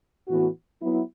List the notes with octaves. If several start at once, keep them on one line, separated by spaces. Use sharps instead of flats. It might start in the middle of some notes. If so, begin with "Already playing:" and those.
A2 E3 B3 F#4
F#3 B3 E4